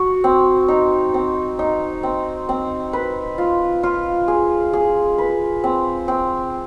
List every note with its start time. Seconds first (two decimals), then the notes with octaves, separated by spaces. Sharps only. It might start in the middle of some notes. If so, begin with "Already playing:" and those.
Already playing: F#4
0.24 C4
0.68 D#4
1.14 C4
1.59 D#4
2.03 C4
2.49 C4
2.93 B4
3.38 F4
3.83 F4
4.28 G#4
4.73 G#4
5.18 B4
5.64 C4
6.08 C4